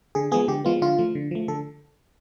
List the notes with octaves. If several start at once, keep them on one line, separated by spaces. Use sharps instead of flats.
D3 G#4
F3 G#3 B3 G#4
D3 G4
F3 G#3 B3 F4
D3 F4
F3 A3
D3
F3 A3
D3 A4